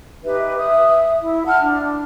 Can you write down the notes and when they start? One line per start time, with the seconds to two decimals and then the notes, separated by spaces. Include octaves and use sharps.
0.25 D#4 G4 B4 E5
0.57 E5 D#6
1.22 E4
1.47 F#5 A5 F6
1.60 D4